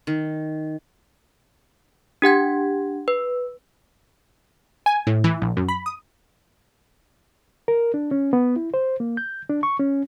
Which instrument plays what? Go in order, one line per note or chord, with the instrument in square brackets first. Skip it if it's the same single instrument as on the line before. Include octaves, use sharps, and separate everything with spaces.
[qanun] D#3
[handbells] D4 G4 F#5 G#6
B4
[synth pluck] G#5
A2
E3
A#1
F#2
B5
D#6
[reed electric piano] A#4
D4
C#4
B3
E4
C5
A#3
G6
D4
C#6
C#4